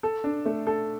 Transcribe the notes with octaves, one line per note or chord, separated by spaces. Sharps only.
A4
D4
A3
A4